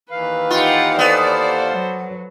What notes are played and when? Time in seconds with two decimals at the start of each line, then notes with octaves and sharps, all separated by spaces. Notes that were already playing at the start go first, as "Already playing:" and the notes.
0.11 D#2 E3 B4 F5
0.51 D#4 F4 G4 F#5
0.99 B3 A4 C5 D5
1.70 F#3